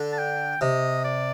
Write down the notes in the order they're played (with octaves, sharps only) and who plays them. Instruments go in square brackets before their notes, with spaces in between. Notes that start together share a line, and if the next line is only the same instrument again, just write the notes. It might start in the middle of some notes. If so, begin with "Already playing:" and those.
Already playing: [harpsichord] D3
[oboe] A5
G5
[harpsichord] C3 [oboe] D#5
[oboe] D5